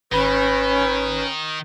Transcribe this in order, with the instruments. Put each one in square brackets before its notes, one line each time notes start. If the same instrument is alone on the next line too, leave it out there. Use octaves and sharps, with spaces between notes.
[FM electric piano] G#1 B5 [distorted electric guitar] D#3 [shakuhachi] C#4 [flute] B4